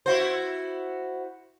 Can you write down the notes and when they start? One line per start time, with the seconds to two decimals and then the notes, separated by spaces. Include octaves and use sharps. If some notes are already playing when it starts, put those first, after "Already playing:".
0.06 E4 F#4 C5